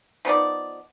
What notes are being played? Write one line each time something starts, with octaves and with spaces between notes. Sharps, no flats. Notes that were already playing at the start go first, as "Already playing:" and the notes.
F3 B3 D#4 D5